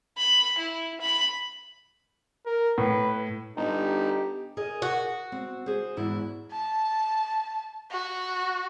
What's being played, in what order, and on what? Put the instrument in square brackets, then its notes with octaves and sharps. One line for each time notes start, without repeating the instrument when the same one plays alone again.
[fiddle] B5
E4
B5
[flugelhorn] A#4
[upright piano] A2 [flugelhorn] B4
[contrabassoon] G1 [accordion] D#4 [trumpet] G4
[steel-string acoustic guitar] G#4 A#4 D#5
[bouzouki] F#4
[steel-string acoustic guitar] C4
G#4 C5
E2 G#2 E4
[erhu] A5
F#4